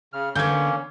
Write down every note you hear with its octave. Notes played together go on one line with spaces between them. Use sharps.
C#3 F6
D3 A#3 B3 C#4 G6 G#6